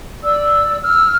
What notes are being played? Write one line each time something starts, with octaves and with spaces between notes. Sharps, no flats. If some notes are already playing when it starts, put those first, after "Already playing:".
D5 E6
E6 F6